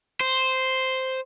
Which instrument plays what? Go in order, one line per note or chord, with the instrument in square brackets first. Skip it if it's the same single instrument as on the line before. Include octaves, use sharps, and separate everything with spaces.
[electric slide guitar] C5